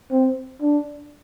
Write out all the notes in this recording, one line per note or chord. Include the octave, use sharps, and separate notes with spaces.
C4
D4